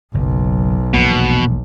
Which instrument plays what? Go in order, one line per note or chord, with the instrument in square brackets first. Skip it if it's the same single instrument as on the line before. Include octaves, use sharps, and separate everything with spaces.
[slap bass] F#1 [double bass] B1
[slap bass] E1 A#1 A#3 [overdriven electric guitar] B2